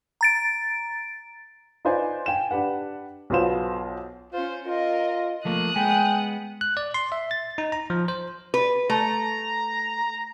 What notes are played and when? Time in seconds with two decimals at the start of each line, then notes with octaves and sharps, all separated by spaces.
0.21 A#5 A6 D7
1.85 D#4 F4 B4 C5 D5 G#5
2.26 G5 G#5 E7
2.51 D4 G4 B4 F#5
3.30 B1 B2 B3 F4 C5 E7
4.33 C#4 F4 C5
4.66 F4 A#4 D#5
5.45 F3 A3 A#3 D#6 F#6
5.76 G#3 B3 G5 G#5
6.61 F#6
6.77 D5
6.94 C6
7.12 E5
7.31 A6
7.58 D#4
7.72 A#5
7.90 F3
8.08 C5
8.54 B4
8.90 A3 A#5